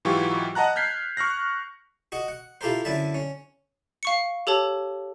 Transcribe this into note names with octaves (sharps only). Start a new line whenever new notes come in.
G#2 E3 F#3 F4 G4 C#6
D#5 F#5 A5 A#5 F#6
F6 G6 G#6 B6 C7
C#6 F6 F#6 A#6
F#4 D#5 F#5
F#5
E4 F4 G4 A4 A#4 C5
F#2 D3 E4 E5 A5
C#4
F5 C#6 C#7
G4 A4 C#5 A5